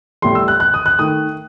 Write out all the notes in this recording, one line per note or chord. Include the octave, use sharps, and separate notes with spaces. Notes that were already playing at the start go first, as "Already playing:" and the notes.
A2 G3 C6
E6
F#6
F#6
D#6
F#6
D#3 A3 D#6